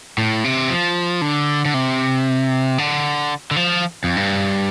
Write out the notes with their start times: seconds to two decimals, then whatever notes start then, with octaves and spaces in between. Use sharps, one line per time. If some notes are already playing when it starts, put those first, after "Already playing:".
0.18 A2
0.44 C3
0.70 F3
1.22 D3
1.65 D3
1.74 C3
2.78 D3
3.51 D3
3.56 F3
4.04 F2
4.17 G2